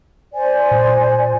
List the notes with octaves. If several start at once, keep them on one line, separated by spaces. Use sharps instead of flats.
C5 D5 G#5
A#2